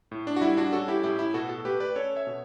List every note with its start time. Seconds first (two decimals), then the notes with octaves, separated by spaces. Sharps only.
0.11 A2
0.27 D4
0.36 F#4
0.41 G3 E4
0.57 D4 F#4
0.72 C#4 F#4 A4
0.88 E4 G4
1.03 A2 E4 G4
1.19 E4
1.34 B2 F#4 A4
1.49 F#4 A4
1.65 A3 G4 B4
1.80 B4 D5
1.96 C#4 A4 C#5
2.16 C#5 E5
2.27 B2